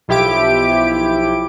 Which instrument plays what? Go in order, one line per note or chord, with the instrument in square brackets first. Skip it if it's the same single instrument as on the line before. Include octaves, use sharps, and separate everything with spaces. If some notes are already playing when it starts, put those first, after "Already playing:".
[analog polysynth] B1 F3 E4 G4 D6 D7